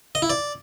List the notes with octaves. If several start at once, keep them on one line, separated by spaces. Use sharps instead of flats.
D#5
E4
D5